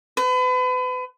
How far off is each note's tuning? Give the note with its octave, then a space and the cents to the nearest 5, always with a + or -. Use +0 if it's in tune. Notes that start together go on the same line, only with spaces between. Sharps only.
B4 +35